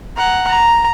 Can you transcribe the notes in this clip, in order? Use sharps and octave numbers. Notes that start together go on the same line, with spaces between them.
F#5 A#5
A#5